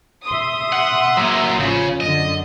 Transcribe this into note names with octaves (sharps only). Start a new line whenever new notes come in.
E5 C6 D#6
F#5
F#3 A#3
A1 C#3 F3
F#2 D3 D#5